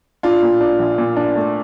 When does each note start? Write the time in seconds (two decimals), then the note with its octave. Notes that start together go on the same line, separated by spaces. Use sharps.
0.23 D4 F4
0.42 A#2
0.61 D4
0.79 A#1
0.98 A#2
1.17 D4
1.36 A3